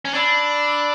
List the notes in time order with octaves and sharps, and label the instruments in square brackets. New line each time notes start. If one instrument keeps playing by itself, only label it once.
[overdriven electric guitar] C#4
[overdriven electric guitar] D4 [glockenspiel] B5 E6 A6 D7 F#7
[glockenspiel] B5 E6 A6 D7 F#7